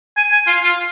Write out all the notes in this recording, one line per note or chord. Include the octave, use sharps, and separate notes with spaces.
G#5
G#5
F4
F4